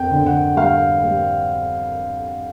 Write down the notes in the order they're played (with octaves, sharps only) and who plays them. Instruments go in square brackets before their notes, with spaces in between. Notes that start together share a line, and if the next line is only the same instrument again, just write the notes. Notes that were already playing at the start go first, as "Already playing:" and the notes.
Already playing: [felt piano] F2 G5
D3
F#5
G3 F5
G3